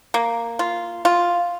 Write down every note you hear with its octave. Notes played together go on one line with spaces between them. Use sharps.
A#3
F4
F4